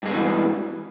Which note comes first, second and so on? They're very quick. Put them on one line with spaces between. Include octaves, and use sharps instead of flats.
G2 G#3 D3 B2 E3